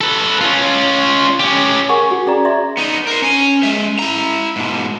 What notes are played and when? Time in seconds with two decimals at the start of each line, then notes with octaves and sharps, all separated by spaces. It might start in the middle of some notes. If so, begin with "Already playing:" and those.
0.01 A4 B4
0.41 C#4 F4
1.40 C#4 G4
1.89 G#4 A#4 F#5 G#5 C#6
2.11 F#4
2.27 C#4 G#4 D5 A#5
2.45 D5 E5 A#5 C6
2.77 B3 D#4
3.07 A#4 C5
3.22 C#4 G#5
3.63 G#3 E5
3.99 E4 A#5
4.56 G#2 B2